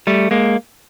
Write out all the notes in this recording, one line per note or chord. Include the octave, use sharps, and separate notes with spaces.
G3 A3
G#3 A#3